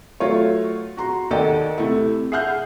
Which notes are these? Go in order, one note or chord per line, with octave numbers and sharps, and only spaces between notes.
F#3 A3 F4 C#5
F#4 A#5 C6
D#2 A4 D5 D#5 F#5 G5
C3 A3 E4
G#4 E5 F#5 F6 G6